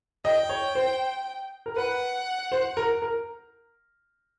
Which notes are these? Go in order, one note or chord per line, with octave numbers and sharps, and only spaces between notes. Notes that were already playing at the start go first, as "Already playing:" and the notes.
D#5 G5
C#5
C5
A#4
B4 F#5
C5
A#4
A#4